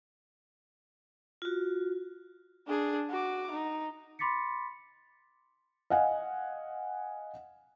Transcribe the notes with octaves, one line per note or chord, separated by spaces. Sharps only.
F4 F#4
D4 G#4
F#4 D6
D#4
B5 C6 D6 A6 B6 C#7
D#5 F5 F#5 G#5